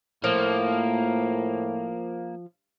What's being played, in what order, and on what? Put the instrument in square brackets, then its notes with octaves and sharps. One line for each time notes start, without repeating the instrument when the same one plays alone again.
[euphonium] A2 [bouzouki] F3 [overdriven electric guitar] A#3